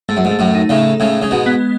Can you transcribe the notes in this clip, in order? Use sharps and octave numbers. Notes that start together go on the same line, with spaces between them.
G#2 A3
F#2
G#2
A3
F#2 A2
D#4
A2 C#3
A4
A2 C#3 G#3
C#3 G#3
G#2 B2
B3